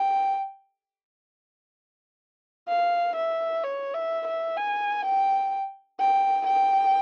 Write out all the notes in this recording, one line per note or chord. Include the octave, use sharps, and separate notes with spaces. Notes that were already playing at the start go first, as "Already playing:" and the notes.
Already playing: G5
F5
E5
C#5
E5
E5
G#5
G5
G5
G5